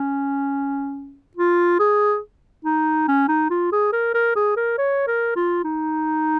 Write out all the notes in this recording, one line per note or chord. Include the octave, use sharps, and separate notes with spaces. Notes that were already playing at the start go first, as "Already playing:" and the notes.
Already playing: C#4
F4
G#4
D#4
C#4
D#4
F4
G#4
A#4
A#4
G#4
A#4
C#5
A#4
F4
D#4